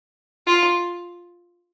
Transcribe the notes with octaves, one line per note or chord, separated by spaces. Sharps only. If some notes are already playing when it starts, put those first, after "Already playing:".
F4